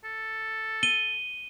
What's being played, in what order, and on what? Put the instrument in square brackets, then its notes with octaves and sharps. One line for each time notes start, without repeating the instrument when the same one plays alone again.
[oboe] A4
[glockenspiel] D#7 G7